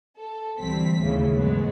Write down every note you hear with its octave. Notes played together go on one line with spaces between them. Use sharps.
A4
D2 E3 G3 C4 B6
D#2 A2 C#3 E3
D2 G#2 F#3 G#3 B3